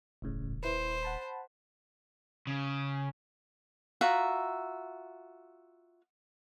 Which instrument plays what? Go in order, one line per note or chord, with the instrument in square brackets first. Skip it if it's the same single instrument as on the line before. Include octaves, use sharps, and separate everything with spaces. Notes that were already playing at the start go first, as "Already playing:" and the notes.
[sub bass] D#1 [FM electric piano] G#1 A2 C#3
[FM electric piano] E4 B4 [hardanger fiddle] C5
[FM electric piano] F#5 A5 B5
[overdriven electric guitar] C#3
[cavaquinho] F4 F#4 E5 A#5